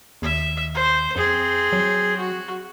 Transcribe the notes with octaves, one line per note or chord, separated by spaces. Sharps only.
D#2 E5
C5
F2 C4 G#4
F#3
F#4